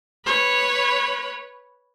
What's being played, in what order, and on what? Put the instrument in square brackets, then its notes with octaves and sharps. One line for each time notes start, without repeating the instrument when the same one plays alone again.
[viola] B4 C#5